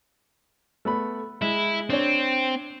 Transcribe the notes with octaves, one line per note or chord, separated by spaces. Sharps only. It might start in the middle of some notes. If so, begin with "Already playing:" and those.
A3 B3 B5
G#3 E4
C4 D4 C#5